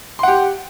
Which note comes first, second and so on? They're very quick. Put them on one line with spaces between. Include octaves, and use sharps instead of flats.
C6 F#5 G4